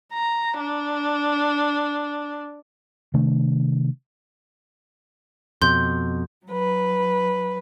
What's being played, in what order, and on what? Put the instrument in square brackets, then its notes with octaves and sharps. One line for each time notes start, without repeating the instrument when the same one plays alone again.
[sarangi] A#5
D4
[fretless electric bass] C3 D#3 A3 D4
[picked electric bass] F2 B2 [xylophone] C6 G6
[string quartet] F#3 B4